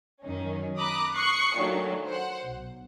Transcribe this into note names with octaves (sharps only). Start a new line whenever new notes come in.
F#2 D#3 C#4
A#5 B5 D6 D#6 F#6
C#6 D#6 F#6 C7 C#7
A#2 D#3 F#3 A3 D4
C5 F#5
B1